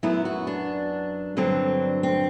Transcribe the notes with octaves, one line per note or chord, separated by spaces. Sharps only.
F#2 F#3 B3 E4
F#4
D4
G2 D3 F#3 C4
C4